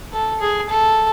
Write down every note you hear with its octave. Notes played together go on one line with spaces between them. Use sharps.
A4
G#4
A4